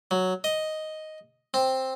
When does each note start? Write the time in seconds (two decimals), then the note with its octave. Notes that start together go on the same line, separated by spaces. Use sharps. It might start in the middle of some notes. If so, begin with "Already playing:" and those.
0.11 F#3
0.44 D#5
1.54 C4